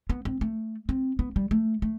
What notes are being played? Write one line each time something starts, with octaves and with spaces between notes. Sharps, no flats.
B3
C4
A3
C4
B3
G3
A3
A3